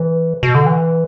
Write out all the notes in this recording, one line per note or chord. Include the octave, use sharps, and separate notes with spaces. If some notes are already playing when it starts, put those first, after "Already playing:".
Already playing: E3
B2
D3
E3